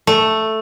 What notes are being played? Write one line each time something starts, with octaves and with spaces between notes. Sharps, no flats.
A3